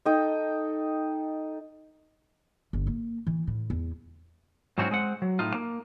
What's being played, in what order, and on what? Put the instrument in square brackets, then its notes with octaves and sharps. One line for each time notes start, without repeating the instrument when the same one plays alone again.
[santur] D#4 A4 D#5 G5
[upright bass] G1
A#3
E3
A2
E2
[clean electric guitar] G#2 E3 F#3 C4 C#4 F#4
G#3 C4 F#5
F#3
A2 D#4 F4
A#3